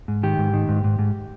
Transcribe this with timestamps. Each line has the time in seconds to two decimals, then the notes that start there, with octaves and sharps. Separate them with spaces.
0.08 G#2
0.23 D#3 G4
0.38 G#2
0.53 D#3
0.69 G#2
0.84 G#2
0.99 G#2